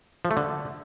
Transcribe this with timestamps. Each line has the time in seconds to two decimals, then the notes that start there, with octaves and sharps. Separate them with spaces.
0.25 F3
0.31 A3
0.37 D3